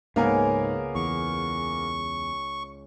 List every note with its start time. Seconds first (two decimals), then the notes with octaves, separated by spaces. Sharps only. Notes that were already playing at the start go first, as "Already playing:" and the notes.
0.16 C#2 G#2 C#3 A#3 B3 A#4 G#5
0.95 E2 C#6